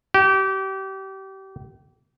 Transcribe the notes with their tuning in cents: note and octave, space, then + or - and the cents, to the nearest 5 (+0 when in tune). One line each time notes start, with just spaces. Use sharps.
G4 -30